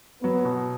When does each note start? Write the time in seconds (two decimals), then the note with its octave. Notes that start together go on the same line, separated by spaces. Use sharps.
0.23 F#3 B3
0.45 B2